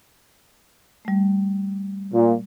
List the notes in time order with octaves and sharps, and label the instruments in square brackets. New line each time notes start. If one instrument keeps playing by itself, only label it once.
[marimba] G3 A3
[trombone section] A#2